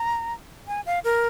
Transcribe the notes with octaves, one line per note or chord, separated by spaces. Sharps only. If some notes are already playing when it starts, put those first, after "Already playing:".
Already playing: A#5
G#5
F5
A#4